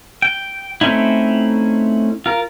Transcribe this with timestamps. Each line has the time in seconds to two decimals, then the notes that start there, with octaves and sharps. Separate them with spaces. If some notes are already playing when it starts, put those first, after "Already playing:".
0.22 G5
0.81 A3 C4 C#4 D#4 E4
2.26 F4 A#4